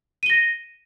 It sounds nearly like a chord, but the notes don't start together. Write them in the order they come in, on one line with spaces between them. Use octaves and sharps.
D#7 G7 A#6